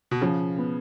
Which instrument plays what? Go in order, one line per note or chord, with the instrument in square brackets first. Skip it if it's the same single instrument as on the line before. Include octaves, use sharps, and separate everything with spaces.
[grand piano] B2
[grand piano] C#3 [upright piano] F3
[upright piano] B3